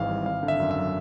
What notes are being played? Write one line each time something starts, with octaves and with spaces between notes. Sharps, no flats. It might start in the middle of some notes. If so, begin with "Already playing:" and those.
Already playing: G#1 G#2 E3 F5
G3
G#1 F5
D3
E5
F#2
E5
F#3